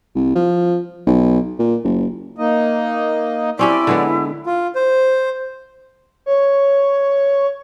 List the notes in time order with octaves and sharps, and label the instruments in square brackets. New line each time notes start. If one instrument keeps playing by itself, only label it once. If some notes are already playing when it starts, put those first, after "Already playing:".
[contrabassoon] C2
F3
B1
A#2
F#1
[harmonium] A#3 D#4 D#5
[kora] C4 C#4 G4 [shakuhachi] E4 [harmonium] D5
[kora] D3 G#3 B3
[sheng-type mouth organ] F4
C5
[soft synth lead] C#5